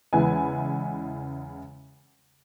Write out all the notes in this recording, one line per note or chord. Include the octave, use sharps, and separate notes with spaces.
E2 C#3 G#3 E4 B4 G#5